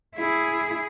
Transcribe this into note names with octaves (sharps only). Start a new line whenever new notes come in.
E4 G#4